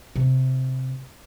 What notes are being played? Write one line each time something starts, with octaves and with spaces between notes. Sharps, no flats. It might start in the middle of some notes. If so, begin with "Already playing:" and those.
C3